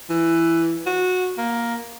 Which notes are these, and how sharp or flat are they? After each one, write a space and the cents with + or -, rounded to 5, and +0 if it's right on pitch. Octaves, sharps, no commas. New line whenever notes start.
E3 +10
F#4 -15
A#3 +5